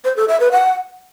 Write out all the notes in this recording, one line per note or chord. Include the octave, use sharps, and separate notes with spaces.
C5
A4
E5
B4
F#5